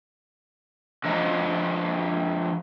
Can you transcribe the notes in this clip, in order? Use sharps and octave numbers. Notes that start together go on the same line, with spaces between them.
D3 F3 D#5 A#5